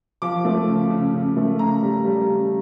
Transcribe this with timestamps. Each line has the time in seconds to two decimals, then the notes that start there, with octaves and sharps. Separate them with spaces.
0.22 F3 D6
0.45 A3
0.67 C#3
0.90 C#3
1.13 C#3
1.37 A3
1.59 C#3 A#5
1.83 G3
2.05 G3
2.28 C#3